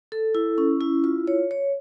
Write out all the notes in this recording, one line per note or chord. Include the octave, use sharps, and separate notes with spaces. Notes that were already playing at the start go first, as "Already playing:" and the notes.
A4
E4
C#4
E4
F4
C#5
C#5